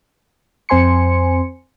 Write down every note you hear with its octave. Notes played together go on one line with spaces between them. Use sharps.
F2 C4 C5 G#5 C6 C#7